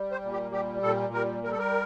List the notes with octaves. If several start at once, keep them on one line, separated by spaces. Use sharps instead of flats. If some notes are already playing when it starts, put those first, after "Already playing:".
Already playing: G3
C5
A#2
G4
G3 G4
A#2 A4
G3 A#4
G3 A#4
A4
A#4